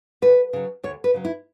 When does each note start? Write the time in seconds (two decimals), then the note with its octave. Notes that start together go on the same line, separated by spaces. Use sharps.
0.22 D2 B4
0.53 C#3 F#3
0.83 D2 C#5
1.04 B4
1.14 C#3 F#3
1.25 E4